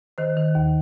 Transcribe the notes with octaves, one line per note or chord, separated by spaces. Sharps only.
D#3 C5
D#3
D#2